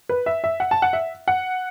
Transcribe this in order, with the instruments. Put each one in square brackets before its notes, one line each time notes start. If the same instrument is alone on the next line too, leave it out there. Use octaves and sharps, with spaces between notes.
[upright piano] B4
E5
E5
F#5
A5
F#5
E5
F#5